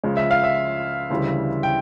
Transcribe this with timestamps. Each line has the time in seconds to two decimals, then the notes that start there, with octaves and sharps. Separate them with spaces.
0.04 C#2 C#3 F3 G#3
0.17 E5
0.31 F5
0.44 E5
1.10 D2 C#3 E3 G3
1.63 G5